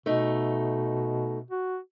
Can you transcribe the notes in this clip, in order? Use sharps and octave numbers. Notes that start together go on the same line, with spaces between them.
B2 A3 D#4
F#4